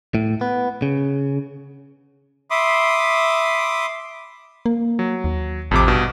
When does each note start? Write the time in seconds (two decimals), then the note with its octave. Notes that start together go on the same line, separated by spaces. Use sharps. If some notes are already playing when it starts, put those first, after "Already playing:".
0.15 A2
0.41 B3
0.82 C#3
2.50 E5 B5 C6 D6 D#6
4.66 A#3
4.99 F#3
5.24 D#2
5.71 A1 F2 C3 D6
5.87 G2 B2